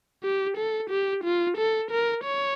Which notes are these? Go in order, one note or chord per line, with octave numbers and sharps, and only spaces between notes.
G4
A4
G4
F4
A4
A#4
C#5